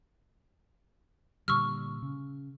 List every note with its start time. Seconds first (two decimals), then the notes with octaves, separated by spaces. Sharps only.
1.48 A#2 D3 G3 C#6 E6 F6
2.02 C#3